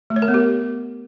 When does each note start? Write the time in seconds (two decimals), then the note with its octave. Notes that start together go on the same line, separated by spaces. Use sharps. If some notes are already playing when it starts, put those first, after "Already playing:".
0.10 A3
0.16 C#5
0.22 A#4
0.28 B3
0.34 G4